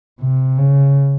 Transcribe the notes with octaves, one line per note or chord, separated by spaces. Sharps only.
C3
C#3